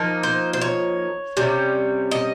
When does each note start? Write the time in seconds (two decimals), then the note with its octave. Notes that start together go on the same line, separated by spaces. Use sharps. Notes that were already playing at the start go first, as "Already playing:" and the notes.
Already playing: F3 A#3 D#4
0.23 C5
0.53 C5
0.61 C#5
1.37 C3 G3 C#4
2.11 D#5